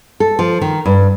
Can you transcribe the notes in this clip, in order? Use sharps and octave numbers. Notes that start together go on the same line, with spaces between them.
A4
F3
D#3
G2